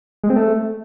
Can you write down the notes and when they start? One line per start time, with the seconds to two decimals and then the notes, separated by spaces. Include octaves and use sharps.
0.24 G#3
0.30 C4
0.36 A3